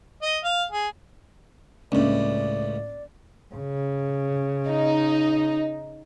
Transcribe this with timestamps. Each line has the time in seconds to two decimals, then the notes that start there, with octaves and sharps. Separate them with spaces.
0.22 D#5
0.44 F5
0.71 G#4
1.92 C#2 A2 A#3 C#4 D4 D5
3.54 C#3
4.67 D#4